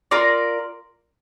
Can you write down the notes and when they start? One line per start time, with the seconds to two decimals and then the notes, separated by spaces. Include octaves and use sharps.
0.11 F4 A#4 D5